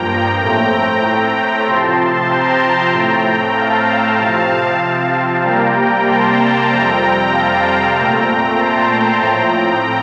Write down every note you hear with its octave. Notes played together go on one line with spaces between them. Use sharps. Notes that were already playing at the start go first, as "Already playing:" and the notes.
Already playing: G2 F3 A#3 G5 A#5
A2 A3 C4 G5 A#5
G5 A#5
C3 F3 C4 A5 C6
G5 A#5
A2 A3 C4 G5 A#5
F5 A5
C3 F3 C4
C3 G3 A#3 G5 A#5
A5 C6
F2 C3 G3 C4 G5 A#5
F5 A5
A#2 A3 C4 G5 A#5
A5 C6
A2 F3 C4 G5 A#5